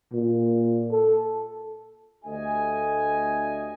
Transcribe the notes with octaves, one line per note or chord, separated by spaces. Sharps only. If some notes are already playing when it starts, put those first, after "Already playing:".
A#2
A4
D2 A3 D4 G4 D#5 G#5